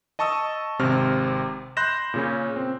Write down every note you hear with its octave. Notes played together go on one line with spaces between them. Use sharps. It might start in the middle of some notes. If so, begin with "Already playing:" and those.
D#5 A5 C#6 D#6 E6
G#1 C3 C4 F6
B5 C6 F#6 G6 A#6 E7
A#2 C#3 C#4
C4